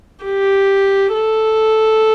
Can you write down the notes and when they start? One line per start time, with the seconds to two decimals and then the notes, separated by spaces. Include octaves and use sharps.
0.25 G4
1.14 A4